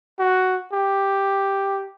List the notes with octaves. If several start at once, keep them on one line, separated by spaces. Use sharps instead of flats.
F#4
G4